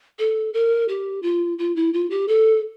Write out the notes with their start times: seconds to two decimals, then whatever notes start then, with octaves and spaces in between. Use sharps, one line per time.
0.19 A4
0.54 A#4
0.88 G4
1.22 F4
1.58 F4
1.76 E4
1.93 F4
2.10 G4
2.28 A4